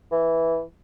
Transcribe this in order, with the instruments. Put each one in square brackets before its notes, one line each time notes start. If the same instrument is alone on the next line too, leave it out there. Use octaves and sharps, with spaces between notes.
[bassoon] E3